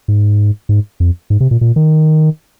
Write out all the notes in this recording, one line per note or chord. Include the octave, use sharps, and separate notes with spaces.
G#2
G#2
F2
G#2
C3
A#2
A#2
D#3